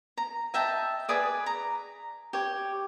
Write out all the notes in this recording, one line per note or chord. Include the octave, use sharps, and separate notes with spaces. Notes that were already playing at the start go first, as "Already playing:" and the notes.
A#5
D#5 E5 G5 A5
G#4 B4 D5 D#6
A#5
G4 C#5